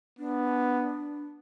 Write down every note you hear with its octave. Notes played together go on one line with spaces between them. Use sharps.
B3 D4